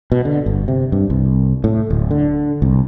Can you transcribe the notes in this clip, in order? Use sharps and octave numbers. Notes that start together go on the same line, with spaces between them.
B2
D3
G1
C3
G2
C2
A2
D1
D3
C2